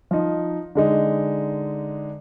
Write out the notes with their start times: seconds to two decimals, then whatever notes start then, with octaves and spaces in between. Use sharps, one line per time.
0.11 F3 D#4
0.75 D3 G#3 D#4